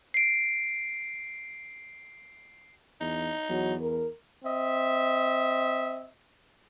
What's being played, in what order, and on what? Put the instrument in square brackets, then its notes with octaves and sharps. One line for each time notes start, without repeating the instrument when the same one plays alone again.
[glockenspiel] C7 D7
[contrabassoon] E2 [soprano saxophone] D#4
[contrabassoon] E2 [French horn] F#3
[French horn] A#4
[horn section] C4 D#5 E5